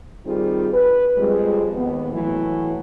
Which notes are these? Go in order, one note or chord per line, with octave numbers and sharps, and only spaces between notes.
D#3 G3 C4 D#4 F4 G#4
B4
F2 G3 G#3
D#2 B3
A2 E3 F#3